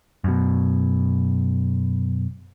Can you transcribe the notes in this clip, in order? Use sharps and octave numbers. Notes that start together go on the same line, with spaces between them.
F#2 B2